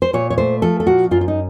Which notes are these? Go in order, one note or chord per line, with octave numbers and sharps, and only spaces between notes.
C5
A#2 C#5
C#5
A3 C5
F3 A4
A4
A#2 F#4
F#2 F4
F4
D#4